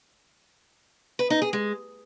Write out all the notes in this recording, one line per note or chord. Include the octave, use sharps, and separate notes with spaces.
B4
D#4
G#4
G#3